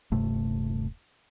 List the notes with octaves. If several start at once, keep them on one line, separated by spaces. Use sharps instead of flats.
D#1 G2 C3 A3